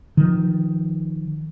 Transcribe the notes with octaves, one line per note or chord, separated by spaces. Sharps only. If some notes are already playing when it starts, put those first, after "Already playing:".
D#3 F3